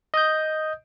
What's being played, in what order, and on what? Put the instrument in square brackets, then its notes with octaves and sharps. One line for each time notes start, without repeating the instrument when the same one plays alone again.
[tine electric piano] D#5 D#6 G6